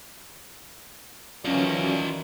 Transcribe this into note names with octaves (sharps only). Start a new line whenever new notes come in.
D#3 E3 F#3 C#4 F4 D5 D#5